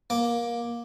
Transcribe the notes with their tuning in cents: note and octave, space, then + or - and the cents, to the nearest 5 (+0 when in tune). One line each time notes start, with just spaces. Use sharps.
A#3 +20 D6 +0